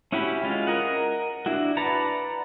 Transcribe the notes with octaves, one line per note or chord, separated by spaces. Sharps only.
C#4 E4 F#4 G4 B5
G#3 C#4 F4
A#4 D#5 F#5
D4 E4 F#4
B4 D5 F#5 A5 A#5